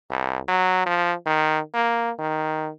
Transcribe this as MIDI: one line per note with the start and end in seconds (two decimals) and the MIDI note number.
0.10 0.39 36
0.48 0.85 54
0.86 1.13 53
1.26 1.60 51
1.74 2.11 58
2.18 2.71 51